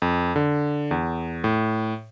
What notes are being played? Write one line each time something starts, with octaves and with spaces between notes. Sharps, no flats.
F2
D3
E2
A2